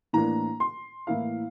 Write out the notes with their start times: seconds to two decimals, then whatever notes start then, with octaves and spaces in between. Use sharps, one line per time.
0.13 A2 E3 A#3 D4 A#5
0.60 C6
1.07 A2 E3 A#3 E4 F5